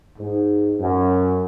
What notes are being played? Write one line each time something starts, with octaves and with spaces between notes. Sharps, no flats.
G#2
F#2